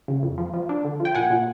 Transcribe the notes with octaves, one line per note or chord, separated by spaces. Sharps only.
C#3
F2
F3
F3
D4
D3
F3
G5
A#2 F#5 G#5
A#2